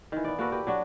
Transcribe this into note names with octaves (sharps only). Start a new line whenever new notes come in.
D#3 E3
B3 D5
A#3 F#4 A4 B4
G4 B4
F#3 D4 F#4